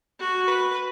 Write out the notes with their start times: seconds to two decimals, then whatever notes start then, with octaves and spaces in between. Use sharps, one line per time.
0.20 F#4
0.48 B4